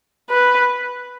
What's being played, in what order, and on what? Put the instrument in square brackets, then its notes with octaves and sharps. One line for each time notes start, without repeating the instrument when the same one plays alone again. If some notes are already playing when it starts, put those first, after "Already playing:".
[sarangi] B4